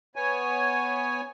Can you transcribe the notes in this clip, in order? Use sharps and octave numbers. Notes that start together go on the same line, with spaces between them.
B3 C#5 G#5